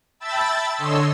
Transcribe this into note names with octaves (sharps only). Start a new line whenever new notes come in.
E5 G5 A5 B5 E6 A6
D3 A4 C#5 D#5 C6 E6